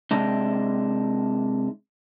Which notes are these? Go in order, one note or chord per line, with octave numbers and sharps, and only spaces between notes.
C3 G#3 D4 D#4